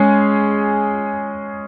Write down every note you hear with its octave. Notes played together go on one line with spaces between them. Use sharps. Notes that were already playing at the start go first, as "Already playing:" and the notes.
Already playing: G#3 C#4 G#4